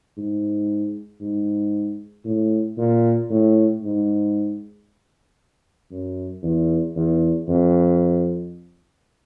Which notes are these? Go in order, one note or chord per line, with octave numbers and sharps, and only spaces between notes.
G#2
G#2
A2
A#2
A2
G#2
F#2
E2
E2
F2